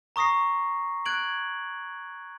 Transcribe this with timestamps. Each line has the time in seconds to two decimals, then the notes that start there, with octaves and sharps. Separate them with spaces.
0.16 A#5 C#6 D#6 A#6 C7
1.06 F#6 G#6 D7 F#7